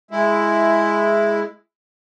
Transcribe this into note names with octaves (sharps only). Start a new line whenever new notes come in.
G#3 E4